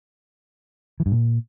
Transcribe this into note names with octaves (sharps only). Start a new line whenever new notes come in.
E3
G2
A#2